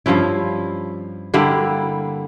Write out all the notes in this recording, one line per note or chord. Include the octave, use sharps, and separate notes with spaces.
G2 F3 C#4 E4
D3 G3 A#3 E4